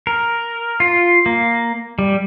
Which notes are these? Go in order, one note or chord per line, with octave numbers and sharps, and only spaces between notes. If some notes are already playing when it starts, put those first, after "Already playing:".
A#4
F4
A#3
G3